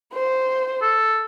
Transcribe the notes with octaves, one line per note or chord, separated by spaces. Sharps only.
C5
A4